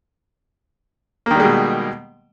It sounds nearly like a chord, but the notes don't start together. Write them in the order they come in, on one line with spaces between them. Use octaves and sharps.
A#3 D#3 G3 G#3 B2